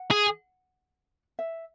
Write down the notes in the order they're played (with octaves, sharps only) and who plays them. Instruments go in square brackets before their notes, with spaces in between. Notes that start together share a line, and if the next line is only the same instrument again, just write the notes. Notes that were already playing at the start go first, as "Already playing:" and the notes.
Already playing: [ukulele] F#5
[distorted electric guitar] G#4
[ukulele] E5